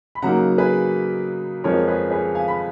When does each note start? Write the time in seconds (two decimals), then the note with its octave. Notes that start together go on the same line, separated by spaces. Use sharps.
0.15 B5
0.22 C#3 F#3 A#3 D#4 F#5 A#5
0.58 G#4 B4
1.64 F2 F3 G#3 A#4 C#5
1.87 G#4 B4
2.11 G#4 B4
2.35 F5 G#5
2.48 B5